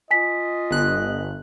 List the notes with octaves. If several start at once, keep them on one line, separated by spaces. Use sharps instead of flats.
F4 D#5 G#5 B6
G1 F#6